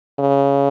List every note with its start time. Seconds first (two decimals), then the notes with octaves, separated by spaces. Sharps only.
0.20 C#3